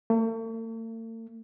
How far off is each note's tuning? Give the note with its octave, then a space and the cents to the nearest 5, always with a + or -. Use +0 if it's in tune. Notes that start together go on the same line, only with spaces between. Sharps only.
A3 +45